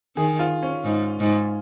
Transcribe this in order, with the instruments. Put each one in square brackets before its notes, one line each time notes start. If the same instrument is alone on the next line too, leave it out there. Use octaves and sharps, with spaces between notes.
[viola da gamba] D#3 [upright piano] G#4
[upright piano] F4
C#4
[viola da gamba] G#2
G#2